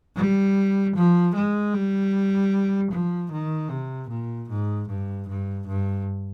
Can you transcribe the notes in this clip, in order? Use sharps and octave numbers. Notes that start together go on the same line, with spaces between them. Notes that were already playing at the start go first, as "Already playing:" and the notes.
G3
F3
G#3
G3
F3
D#3
C3
A#2
G#2
G2
G2
G2